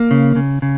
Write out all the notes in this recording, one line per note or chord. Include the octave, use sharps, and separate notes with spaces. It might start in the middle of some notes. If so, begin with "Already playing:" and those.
Already playing: A#3
C#3
C#3
C#3